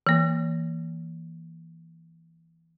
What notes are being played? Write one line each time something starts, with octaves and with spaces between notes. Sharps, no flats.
E3 A#3